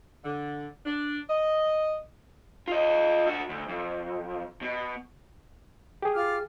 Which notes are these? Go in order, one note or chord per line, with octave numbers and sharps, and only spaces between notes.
D3
D4
D#5
F4 D#5
D4 F#4
D2
F2
B2
G4 G#4
F4 D6 F6